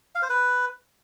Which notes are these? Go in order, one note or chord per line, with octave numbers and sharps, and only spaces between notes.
F5
C5
B4